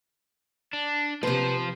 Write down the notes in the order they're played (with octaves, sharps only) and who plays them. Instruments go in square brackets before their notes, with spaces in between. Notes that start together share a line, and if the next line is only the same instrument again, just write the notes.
[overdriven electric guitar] D4
[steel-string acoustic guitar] C3 B4 [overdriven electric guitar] F3 C5